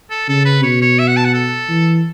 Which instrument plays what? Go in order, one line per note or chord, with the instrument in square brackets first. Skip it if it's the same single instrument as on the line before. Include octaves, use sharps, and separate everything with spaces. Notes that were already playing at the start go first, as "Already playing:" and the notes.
[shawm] A4
[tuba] C#3 [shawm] A4
[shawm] B4
[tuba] B2 [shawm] C#5
[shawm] C#5
E5
F#5
A5
F#5
A4
[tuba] E3